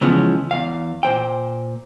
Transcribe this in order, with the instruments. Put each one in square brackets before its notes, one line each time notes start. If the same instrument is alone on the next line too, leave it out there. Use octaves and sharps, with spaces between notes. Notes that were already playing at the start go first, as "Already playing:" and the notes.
[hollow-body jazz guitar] C#3 E3 F3 G#3 B3 C#4
E2 F5
A#2 C5 G5